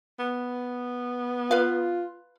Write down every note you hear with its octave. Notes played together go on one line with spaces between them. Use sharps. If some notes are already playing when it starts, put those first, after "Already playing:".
B3
F4 B4 F5